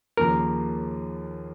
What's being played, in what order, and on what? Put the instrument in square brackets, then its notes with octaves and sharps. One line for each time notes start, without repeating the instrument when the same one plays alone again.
[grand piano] D#2 C#3 F3 A#3 [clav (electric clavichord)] A#4